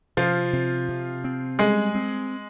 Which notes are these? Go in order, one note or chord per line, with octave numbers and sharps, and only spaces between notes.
C3 F3 F4
C3
C3
C4
G3 G#3 G#4
C4